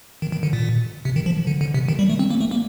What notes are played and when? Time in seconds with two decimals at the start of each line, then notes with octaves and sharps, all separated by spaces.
0.22 D#3
0.32 D#3
0.43 D3
0.53 A#2
1.05 C3
1.16 D#3
1.26 F3
1.47 D3
1.61 D3
1.74 C3
1.89 D#3
1.99 G3
2.10 A3
2.19 C4
2.31 A#3
2.41 A3
2.51 A#3